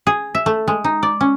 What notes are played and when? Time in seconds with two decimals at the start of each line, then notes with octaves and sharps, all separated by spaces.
0.07 G#4
0.35 E5
0.46 A3
0.68 G#3
0.84 D#4
1.03 D5
1.20 C#4